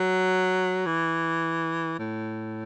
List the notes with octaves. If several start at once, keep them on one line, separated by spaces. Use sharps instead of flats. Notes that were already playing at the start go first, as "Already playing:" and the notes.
Already playing: F#3
E3
A2